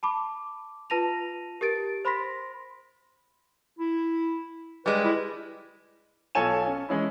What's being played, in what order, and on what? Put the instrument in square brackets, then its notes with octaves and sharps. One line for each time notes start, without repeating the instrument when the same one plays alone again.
[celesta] A5 B5 D6
F4 B4 A5 A#6 D#7 F7
G4 A#4 A6 D7
C5 B5 C6 A#6 B6
[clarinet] E4
[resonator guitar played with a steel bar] G3 G#3 [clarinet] B4
[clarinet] E4
[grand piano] B1 F4 A4 C#5 G#5 E7
C#4
E3 G#3 C#4 E4